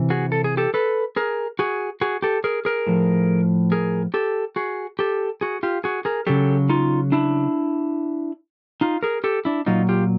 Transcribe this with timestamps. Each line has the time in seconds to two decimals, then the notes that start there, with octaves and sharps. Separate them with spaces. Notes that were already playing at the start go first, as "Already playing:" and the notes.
Already playing: C3 E3
0.10 F#4 G#4
0.32 A4
0.44 G#4
0.57 G4 A4
0.74 A4 B4
1.16 G#4 A#4
1.59 F#4 G#4
2.01 F#4 G#4
2.22 G4 A4
2.44 G#4 A#4
2.65 G#4 A#4
2.87 A2 F3
3.72 G#4 A#4
4.14 G4 A4
4.56 F#4 G#4
4.99 G4 A4
5.41 F#4 G#4
5.63 F4 G4
5.84 F#4 G#4
6.05 G#4 A#4
6.27 C#3 F#3 G4 A4
6.69 D#4 F4
7.12 D4 E4
8.81 D#4 F4
9.03 G#4 A#4
9.24 G4 A4
9.45 D4 E4
9.66 A#2 F#3 D#4 F4
9.89 F4 G4